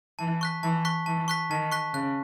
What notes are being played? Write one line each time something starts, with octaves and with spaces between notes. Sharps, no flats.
E3 A5
C#6 F#6 B6
E3 A5
C#6 F#6 B6
E3 A5
C#6 F#6 B6
D#3 A5
C#6 F#6 B6
C#3 F#6